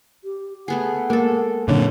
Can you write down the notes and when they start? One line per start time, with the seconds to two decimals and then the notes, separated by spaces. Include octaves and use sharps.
0.24 G4
0.68 A3 B3 G#4 F#5
1.10 G#3 A#3 A4
1.68 F#2 A#2 D3 C4